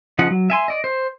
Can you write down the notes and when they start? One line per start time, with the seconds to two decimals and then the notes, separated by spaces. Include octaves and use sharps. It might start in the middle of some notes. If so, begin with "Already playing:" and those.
0.19 C#3 F3 D#4 F#5
0.30 F#3
0.50 E5 G#5 C6
0.68 D5 D#5
0.84 C5